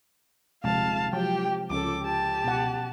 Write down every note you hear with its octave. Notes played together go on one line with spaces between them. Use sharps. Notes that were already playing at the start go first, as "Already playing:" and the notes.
D#1 C3 F3 G#3 F5 A5
F3 F#3 G4 G5
C#2 F3 C#4 A4 D6
G4 A5
B2 F#5